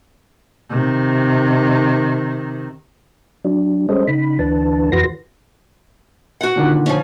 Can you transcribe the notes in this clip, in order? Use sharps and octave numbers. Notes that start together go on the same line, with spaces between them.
C3 D#3
F#3 D4
G3 G#3 C#4 A4 C5 D#5
C#3 D#4 B5
D2 E3 D4 B4 A5
F2 E3 F#4 B4 C6 A#6
F#4 F#5
A#2 D3 D#3
F3 C#4